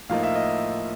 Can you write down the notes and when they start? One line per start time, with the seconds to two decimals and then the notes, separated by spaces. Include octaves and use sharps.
0.09 A2 F3 A#3 D#4 F5
0.23 E5
0.35 D#5